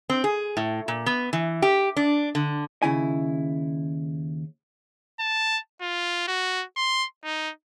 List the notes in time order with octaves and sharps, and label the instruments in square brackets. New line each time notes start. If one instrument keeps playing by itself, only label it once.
[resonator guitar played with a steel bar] C4
G#4
A2
A#2
B3
E3
G4
D4
D3
[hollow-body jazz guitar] D#2 C#3 E4 G#5
[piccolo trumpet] A5
F4
F#4
C6
D#4